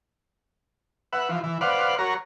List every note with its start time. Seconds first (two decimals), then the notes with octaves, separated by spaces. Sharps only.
1.13 B4 E5 F#5
1.29 E3 F3
1.44 E3
1.61 B4 C5 D5 F5 F#5
1.99 F#4 A#4 C#5 A#5